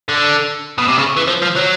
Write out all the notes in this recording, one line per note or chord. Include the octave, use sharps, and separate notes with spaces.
D3
B2
C3
C#3
E3
F3
F3
F#3